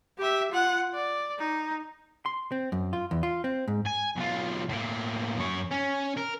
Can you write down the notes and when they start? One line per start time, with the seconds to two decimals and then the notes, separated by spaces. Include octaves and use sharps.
0.18 G4 E5
0.51 F4 F#5
0.94 D5
1.39 D#4
2.26 C6
2.52 C4
2.72 F#2
2.93 F4
3.11 E2
3.23 F4
3.44 C4
3.68 G#2
3.87 G#5
4.16 B1 F4
4.69 A2 A#3
5.37 F#2 C#5
5.71 C#4
6.17 A#4